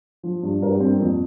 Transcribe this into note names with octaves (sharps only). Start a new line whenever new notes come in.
F3
G2
G2 A#4
G4
G2 C4
A#3
F2